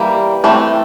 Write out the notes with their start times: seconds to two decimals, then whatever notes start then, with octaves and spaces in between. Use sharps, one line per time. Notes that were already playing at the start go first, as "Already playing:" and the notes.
Already playing: E3 G3 A#3
0.44 E3 A3 C4